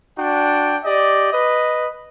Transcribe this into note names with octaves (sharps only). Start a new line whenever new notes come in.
D4 F#4 G5
G4 D5 D#5
B4 D#5